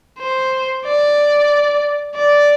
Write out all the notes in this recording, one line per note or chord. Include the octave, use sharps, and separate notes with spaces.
C5
D5
D5